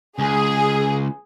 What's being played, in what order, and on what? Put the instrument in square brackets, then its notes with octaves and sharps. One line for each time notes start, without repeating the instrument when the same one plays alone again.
[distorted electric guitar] C#2 [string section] G#4